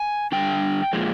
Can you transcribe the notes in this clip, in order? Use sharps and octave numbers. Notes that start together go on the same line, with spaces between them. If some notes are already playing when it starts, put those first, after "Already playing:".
Already playing: G#5
D3 G3 D4 G5
A#2 F3 G#3